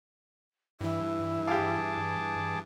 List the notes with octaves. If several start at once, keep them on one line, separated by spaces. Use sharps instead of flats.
G2 E3 E4
G4 G#4 F5 A5 D6